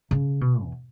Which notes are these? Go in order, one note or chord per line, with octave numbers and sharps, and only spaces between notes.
C#3
B2
E2